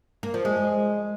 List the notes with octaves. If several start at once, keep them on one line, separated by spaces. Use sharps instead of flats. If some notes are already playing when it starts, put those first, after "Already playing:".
A#3
F3
G#3